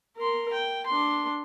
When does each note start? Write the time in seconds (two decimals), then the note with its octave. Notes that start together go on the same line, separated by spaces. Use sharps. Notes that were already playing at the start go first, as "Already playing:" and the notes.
0.17 A#4 C6
0.53 G5
0.86 D4 C6